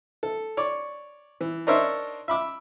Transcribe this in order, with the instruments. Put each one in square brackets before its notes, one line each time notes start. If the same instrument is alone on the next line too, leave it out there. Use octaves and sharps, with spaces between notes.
[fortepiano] A4
C#5 D5
E3
D4 D#4 A#4 C5 C#5 E5
E5 B5 D6 E6